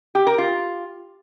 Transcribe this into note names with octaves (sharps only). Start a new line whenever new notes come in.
G4
A#4
F4